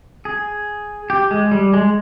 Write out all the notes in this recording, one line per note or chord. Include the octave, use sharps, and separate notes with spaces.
G#4
G4
G#3
G3
G#3